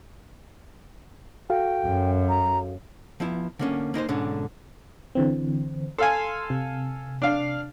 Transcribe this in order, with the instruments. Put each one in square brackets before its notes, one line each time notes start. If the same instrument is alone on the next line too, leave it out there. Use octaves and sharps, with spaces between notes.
[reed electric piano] F#4 A4 F5 [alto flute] G5
[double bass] F#2
[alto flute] A#5
[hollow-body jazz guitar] F3 B3 E4
D3 A#3 C#4
A#3 D#4 A#4 C5
G#2 B2 D3 C#4 D4
[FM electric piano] D3 E3 C4
[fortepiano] A4 F5 G#5 [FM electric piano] C6
[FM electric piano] C3
[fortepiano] D4 F5